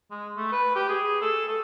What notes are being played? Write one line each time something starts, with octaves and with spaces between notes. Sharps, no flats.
G#3
A3
B4
G4
G#4
A4
A4